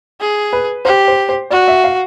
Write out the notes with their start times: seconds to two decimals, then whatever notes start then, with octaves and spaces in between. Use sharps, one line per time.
0.21 G#4
0.53 B4
0.85 G4 C5
1.08 C5
1.29 C5
1.50 F#4 D5
1.68 E5
1.84 F5